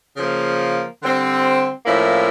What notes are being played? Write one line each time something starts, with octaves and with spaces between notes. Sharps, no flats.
C#3 F3 A#3
D3 G3 C4
A2 F3 A#3 C#4 E4